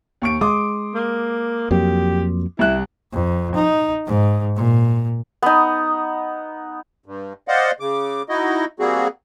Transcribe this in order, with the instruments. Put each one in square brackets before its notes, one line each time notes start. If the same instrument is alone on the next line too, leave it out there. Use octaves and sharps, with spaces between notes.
[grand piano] D#2 C#6 D7
[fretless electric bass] G#3 [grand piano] C6 D6 D#6
[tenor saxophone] A#3
[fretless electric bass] F2 F#3 A#3 [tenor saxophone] G4
[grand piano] C2 F#6 [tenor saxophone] E4
[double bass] F2
D#4
G#2
A#2
[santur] B3 D#4
[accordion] G2
C5 D5 D#5 F5 F#5
C#3 D6
D#4 E4 F#4 D#5
G3 A#3 C4 F#4 G#4